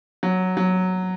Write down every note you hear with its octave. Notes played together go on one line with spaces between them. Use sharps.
F#3
F#3